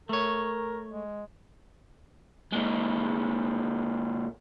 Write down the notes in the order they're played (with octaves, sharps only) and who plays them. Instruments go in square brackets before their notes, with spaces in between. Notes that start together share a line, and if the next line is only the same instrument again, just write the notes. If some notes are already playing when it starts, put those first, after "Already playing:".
[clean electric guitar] A3 C#5 [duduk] A#4
[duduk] G#3
[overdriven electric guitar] A#2 G#3